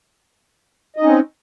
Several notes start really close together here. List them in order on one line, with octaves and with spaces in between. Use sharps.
D#5 D#4 C#4 C4